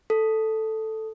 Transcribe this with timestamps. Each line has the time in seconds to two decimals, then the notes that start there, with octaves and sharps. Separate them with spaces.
0.10 A4